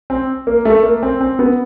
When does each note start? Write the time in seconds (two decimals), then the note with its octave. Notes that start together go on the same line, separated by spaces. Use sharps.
0.10 C4
0.47 A#3
0.65 A3
0.83 A#3
1.03 C4
1.21 C4
1.39 B3